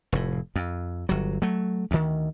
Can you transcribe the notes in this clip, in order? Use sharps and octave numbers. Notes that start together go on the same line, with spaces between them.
F1 A2
F2
G1 F#3
F#3 A3
D2 D#3